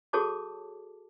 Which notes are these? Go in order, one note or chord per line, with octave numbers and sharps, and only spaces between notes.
F#4 G#4 A4 C#5 A5 D6